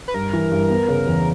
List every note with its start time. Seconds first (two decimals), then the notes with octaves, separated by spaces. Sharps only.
0.08 B4
0.14 G2 A#4
0.33 E3
0.51 G2
0.70 B3
0.88 C#3
1.07 E2